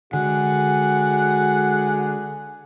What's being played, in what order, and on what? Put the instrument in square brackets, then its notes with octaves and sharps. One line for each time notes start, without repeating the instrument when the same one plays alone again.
[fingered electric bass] D3 [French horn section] G#3 F#4 [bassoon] G#4 [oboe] F#5